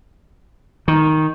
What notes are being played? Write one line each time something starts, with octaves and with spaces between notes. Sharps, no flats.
D#3